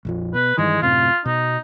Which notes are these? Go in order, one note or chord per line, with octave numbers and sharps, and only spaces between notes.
A#1 F2 F3
B2 B4
G2 D#3 E3 G#3
F#2 A2 C3 F4
B2 D#4